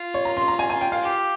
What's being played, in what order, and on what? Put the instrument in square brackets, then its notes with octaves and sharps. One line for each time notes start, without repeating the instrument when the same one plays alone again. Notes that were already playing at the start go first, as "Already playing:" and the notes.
Already playing: [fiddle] F4
[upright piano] C#5
A#5
C6
A#5
G#5
G#5
G5
F5
[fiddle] G4